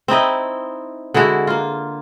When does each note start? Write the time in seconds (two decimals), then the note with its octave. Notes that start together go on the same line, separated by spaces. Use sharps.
0.08 C4 D#4 E4 D#5
1.14 D3 G#3 E4 F#4
1.47 A#3 F4